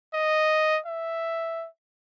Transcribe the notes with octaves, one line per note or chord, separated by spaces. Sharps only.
D#5
E5